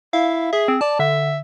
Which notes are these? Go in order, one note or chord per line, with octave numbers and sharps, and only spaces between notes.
E4 F5
G#4 E5
C4
D5 A5
D3 E5